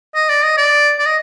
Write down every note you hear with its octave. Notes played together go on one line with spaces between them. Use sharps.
D#5
D5
D#5
D5
D5
D#5